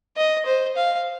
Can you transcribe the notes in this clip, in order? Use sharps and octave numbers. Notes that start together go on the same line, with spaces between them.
D#5
C5
F5